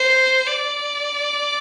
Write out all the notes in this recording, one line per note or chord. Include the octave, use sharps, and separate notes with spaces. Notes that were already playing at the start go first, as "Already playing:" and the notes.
Already playing: C5
D5